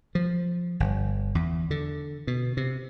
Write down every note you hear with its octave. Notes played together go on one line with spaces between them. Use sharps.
F3
G1
E2
D3
B2
C3